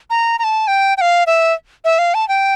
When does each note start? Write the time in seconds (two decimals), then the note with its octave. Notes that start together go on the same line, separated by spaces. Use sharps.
0.10 A#5
0.39 A#5
0.44 A5
0.68 G5
0.97 G5
1.01 F5
1.27 E5
1.85 E5
1.99 F5
2.14 A5
2.29 G5